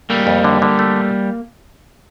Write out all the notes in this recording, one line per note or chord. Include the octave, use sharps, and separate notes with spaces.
G3 A3 A#3
F2
D3
D3
A3